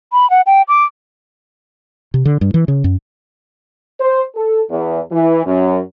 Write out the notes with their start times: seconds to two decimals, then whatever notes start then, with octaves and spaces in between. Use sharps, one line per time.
0.13 B5
0.30 F#5
0.46 G5
0.68 D6
2.14 C3
2.25 D3
2.41 G2
2.54 E3
2.68 C#3
2.84 F#2
4.00 C5
4.36 A4
4.70 E2
5.12 E3
5.46 F#2